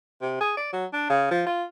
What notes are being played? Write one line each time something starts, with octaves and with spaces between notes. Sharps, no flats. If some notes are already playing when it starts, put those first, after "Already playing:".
C3
G#4
D5
F#3
D4
C#3
F3
F4